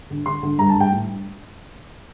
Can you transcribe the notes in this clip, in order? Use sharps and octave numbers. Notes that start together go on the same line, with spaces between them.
D3
D3 C6
D3
G2 A#5
A5
G2
G5
A2